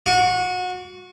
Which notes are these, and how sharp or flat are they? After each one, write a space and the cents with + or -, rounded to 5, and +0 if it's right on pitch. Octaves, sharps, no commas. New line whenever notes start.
F#4 -25 C#6 +35